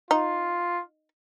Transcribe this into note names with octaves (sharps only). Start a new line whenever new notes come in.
D#4 F4